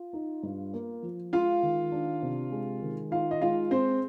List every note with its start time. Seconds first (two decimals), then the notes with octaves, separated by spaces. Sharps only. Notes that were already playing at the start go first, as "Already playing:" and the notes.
Already playing: F4
0.13 D#4
0.43 G2
0.73 A#3
1.03 F3
1.33 G#3 F4 F5
1.63 D#3
1.92 D4
2.22 C3
2.51 G#3
2.82 D#3
3.11 D#4 F4 F5
3.31 D#5
3.41 G#3 F4 F5
3.70 C4 G#4 C5